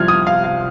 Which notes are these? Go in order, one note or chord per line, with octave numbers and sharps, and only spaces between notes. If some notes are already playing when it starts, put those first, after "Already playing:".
Already playing: C2 C3 F3 F6 G#6
D#6
F5
F5